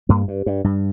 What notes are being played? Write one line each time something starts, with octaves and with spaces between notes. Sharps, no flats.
G2 A#3
G2
G2
G2